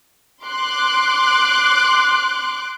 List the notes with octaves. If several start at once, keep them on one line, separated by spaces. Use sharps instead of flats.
C6 D6 F#6